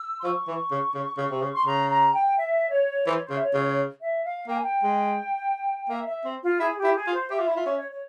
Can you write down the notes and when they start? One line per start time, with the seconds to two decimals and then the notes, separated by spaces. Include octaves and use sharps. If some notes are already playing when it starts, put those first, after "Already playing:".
Already playing: E6
0.19 C6
0.24 F3 C#6
0.48 E3
0.71 C#3
0.95 C#3
1.18 C#3
1.31 C3
1.42 C#3
1.54 C6
1.65 C#3 A#5
1.89 A#5
2.13 G5
2.36 E5
2.72 C#5
3.07 E3 C5
3.17 C#5
3.25 C5
3.30 C#3
3.35 E5
3.42 C#5
3.54 C#3
4.01 E5
4.25 F5
4.48 A#3 G5
4.55 G#5
4.62 G5
4.83 G#3
5.89 A#3 E5
6.07 E5
6.25 C4
6.43 F4
6.60 E4 G#4
6.78 G4
6.84 E4
6.95 G#4
7.07 F4
7.13 C5
7.30 G4 E5
7.40 F4
7.48 E4
7.55 F4 E5
7.66 C#4
7.78 C#5
7.91 C#5